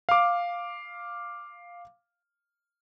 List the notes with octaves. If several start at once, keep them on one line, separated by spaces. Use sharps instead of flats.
F5 D6